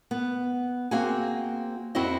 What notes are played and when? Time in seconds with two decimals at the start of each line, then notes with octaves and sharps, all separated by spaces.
0.11 B3
0.91 A#3 C4 F#4 G#4 G#5
1.95 F2 C4 E4 F#4 C5 D#5